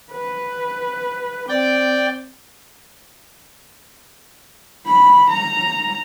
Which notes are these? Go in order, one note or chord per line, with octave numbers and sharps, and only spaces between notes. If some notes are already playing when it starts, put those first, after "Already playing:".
B4
C4 D5 G5
B5
A#5